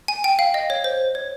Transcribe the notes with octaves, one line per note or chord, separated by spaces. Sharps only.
G#5
G5
F5
D#5
C#5
C5
C#5